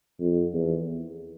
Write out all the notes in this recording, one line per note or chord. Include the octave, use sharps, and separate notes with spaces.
F2
E2